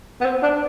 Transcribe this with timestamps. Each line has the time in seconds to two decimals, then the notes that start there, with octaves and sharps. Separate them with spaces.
0.21 B3
0.25 C4
0.43 D4